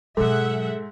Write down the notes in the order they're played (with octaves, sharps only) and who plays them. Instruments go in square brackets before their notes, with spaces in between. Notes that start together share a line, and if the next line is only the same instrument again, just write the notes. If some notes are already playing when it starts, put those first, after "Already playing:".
[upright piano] G#2 [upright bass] B2 F#3 [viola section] G#4 E5 F#5 [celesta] A4